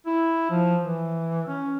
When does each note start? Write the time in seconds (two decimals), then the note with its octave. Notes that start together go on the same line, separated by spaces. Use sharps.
0.06 E4
0.51 F3
0.82 E3
1.47 C#4